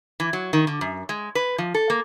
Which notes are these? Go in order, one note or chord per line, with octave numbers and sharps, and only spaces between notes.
E3
F#3
D#3
D3
F#2
G#3
B4
F3
A4
A#3